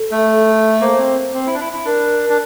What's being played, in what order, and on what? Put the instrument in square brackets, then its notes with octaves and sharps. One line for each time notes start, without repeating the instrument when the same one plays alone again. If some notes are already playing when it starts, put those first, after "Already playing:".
Already playing: [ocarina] A4
[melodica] A3
[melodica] A#3 [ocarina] C5
[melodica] C4
C4
E4
D4
E4
E4
[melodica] D4 [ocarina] A#4
[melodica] D4